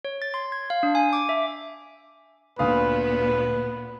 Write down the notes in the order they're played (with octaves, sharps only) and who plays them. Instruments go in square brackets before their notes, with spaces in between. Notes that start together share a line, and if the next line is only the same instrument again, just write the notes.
[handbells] C#5
A6
C6
G#6
F5
D4
G#5
D6
E5
[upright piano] D2 F5 D#6 [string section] A#2 B3 [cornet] B4